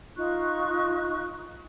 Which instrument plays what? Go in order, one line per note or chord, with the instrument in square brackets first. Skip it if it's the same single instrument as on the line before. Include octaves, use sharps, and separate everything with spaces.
[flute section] D#4 F4 C#6 F#6